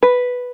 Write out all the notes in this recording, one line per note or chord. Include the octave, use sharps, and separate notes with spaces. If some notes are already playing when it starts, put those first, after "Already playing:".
B4